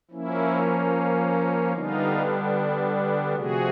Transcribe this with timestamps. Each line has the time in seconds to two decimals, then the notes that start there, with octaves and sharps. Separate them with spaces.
0.11 F3 A#3 C#4 E4
1.73 D3 G3 B3 D4 D#4 F4
3.35 C3 F3 A3 F#4 G#4